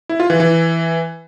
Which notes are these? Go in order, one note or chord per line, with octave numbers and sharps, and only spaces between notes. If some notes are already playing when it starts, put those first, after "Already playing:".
E4
F4
E3
E3